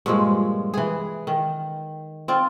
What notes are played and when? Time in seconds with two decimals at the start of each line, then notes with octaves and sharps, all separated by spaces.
0.06 G2 A#2 F3 G#3
0.74 E3 G#4
1.27 D#3
2.28 C4 F4 D5